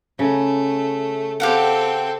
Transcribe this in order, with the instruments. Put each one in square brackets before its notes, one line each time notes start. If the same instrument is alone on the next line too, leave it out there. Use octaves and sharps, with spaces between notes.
[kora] C#3 [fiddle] A3
[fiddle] C4 A4 [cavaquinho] G4 F5 F#5